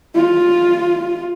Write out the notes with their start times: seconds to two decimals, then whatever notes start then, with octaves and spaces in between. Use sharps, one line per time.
0.15 F4